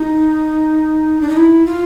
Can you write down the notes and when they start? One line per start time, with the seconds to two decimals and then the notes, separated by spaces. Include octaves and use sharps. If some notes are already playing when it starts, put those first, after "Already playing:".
Already playing: D#4
1.21 D4
1.29 D#4
1.37 E4
1.67 F4